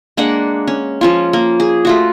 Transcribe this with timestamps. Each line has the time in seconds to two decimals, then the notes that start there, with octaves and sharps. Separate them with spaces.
0.17 G#3 A#3 D4 F#5
0.68 C#4
1.01 F3 C#4 F4
1.33 A#3
1.60 G#4
1.85 A3 F4 F#4